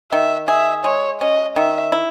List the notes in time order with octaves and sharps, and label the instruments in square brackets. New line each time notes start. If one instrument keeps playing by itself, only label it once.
[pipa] D#3 [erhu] E5
[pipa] G#4 [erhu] E5
[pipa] G#3 [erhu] C#5
[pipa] C#4 [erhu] D#5
[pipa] D#3 [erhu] E5
[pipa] E4